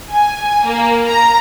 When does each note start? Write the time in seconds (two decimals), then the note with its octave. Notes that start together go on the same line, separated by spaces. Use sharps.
0.11 G#5
0.65 A#3
1.08 A#5